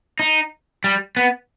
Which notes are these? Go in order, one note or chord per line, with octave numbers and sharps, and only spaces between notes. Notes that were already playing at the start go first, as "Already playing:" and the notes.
D#4
G3
B3